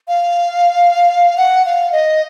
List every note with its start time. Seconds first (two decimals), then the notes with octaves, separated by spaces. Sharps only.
0.08 F5
1.38 F#5
1.65 F5
1.92 D#5